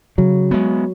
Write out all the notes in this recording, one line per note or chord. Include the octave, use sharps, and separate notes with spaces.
C#3 F#3
G#3 B3